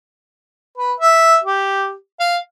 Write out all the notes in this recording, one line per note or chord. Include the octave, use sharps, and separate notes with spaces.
B4
E5
G4
F5